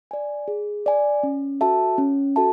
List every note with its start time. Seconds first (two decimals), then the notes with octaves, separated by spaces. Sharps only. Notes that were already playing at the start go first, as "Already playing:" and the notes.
0.11 D5 G#5
0.48 G#4
0.86 D5 G#5
1.23 C#4
1.61 F#4 A4 E5 A5
1.98 C#4
2.36 F#4 A4 E5 A5